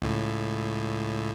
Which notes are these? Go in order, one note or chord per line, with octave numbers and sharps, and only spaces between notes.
C#2 A2